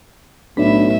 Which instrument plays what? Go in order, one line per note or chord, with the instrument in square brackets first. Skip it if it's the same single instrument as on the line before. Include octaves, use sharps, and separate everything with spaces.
[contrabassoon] B1 [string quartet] A2 E5 [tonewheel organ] D4 B5